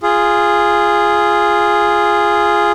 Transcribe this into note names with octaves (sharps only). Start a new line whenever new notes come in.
F4 G#4